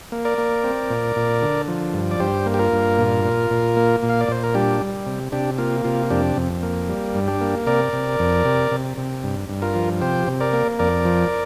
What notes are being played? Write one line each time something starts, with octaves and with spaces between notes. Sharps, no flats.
A#3
A#4 D5
A#3
C4
A#2
A#2
D3
F3
G2
D5
G2 G4 C5
A#3
G4
F4 A#4
G2
A#2
A#2
A#2
A#3
A#2
F5
D5
A#2 C5
A#4
G3 D4 G4
G3
C3
C3 D4 G4
A#3 F4
C3 F4
F2 D4 G4
F2
A#3
G3
G2
D4 G4
A#3
C3 A#4 D5
C3
F2
C3
C3
C3
G2
G2
F4 A#4
F3
C3 G4 C5
C3
A#4 D5
A#3
F2 A#4 D5
F3